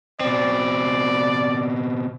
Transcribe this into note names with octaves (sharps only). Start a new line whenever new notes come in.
B2 C4 D5